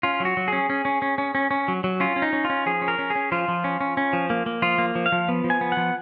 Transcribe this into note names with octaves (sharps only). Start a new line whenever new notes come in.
C#4 F4
F#3 F#4
F#3
C#4 G#4
C#4
C#4
C#4
C#4
C#4
C#4
F#3
F#3
C#4 F4
C#4
D#4
C#4
F4
C#4
F3 G#4
C#4
A#4
C#4
G#4
C#4
F3 F4
F3
C#4
C#4
C#4
F3
A#3
A#3
F3 F4
A#3
F3
F5
F3
B3
F3
G#5
B3
F3 F#5